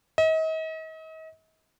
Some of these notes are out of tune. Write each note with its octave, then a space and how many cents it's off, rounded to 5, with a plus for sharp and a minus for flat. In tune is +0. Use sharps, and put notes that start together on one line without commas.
D#5 +40